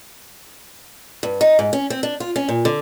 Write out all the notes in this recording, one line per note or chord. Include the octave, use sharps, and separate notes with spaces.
G2
D#4
G#2
C#4
C4
D4
F4
C#4
A#2
D3